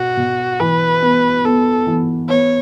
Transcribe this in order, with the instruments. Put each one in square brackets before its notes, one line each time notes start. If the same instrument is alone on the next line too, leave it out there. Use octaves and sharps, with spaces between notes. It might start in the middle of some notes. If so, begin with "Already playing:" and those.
Already playing: [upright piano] B2 [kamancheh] F#4
[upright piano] B2
[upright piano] E3 [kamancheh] B4
[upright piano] B3
[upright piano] B3 [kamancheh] A4
[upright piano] E3
[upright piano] B3 [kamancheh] C#5